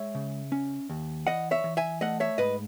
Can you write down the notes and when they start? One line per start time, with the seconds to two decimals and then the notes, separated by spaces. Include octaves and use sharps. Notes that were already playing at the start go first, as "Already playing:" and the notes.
Already playing: G#3 C#5 E5
0.15 C#3
0.52 C#4
0.90 D#2
1.27 E3 D#5 F#5
1.51 C#5 E5
1.64 E3
1.77 E5 G#5
2.01 A3 D#5 F#5
2.20 C#5 E5
2.38 G#2 B4 D#5